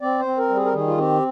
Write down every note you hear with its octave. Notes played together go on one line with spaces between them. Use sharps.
C4 D5
C5
C4
A#4
G3
G#4
A#4
D#3 G#4
F4
C4 G4